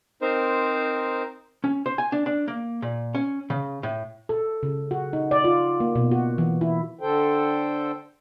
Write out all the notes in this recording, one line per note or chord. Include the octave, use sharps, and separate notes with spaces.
C4 D#4 A#4 C5
C#4
C5
G#5
D4
D4
A#3
A#2
C#4
C#3
A2
A4
C#3
F#4
D#4
D5
F4
A#3
B2
F#4
E3
E4
D3 A4 C5 G5